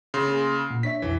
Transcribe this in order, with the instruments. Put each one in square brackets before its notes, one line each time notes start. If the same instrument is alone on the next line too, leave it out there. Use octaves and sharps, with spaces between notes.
[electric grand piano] C#3 C6 [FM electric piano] A#6
[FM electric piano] A#3 G#4
A#2
[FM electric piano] D4 C#5 E5 [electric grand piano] B6
[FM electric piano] B1 F2 G#5 [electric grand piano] E3